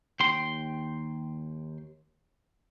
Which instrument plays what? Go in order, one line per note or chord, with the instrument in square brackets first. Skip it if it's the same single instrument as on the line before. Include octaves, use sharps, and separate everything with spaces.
[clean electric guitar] D#2 G5 C6